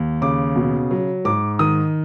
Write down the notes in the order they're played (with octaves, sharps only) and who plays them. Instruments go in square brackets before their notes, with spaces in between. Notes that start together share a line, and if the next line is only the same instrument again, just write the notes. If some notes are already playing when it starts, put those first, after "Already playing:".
Already playing: [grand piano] D#2
C#3 D6
B2
F#3
G#2 D6
D#3 D#6